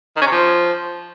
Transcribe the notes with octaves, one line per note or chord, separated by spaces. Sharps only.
D#3
C#4
C3
F3